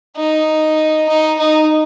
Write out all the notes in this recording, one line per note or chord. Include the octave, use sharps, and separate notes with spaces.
D#4
D#4
D#4